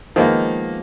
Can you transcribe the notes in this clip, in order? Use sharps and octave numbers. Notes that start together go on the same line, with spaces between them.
D#3 F3 G#3 A#3 B3